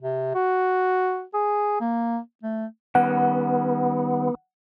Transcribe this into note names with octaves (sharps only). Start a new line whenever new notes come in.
C3
F#4
G#4
A#3
A3
D#3 G3 B3 C#4 F#5